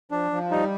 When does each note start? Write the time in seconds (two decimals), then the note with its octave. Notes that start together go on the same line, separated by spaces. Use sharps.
0.11 F3 D4
0.32 F3
0.51 G3 D#4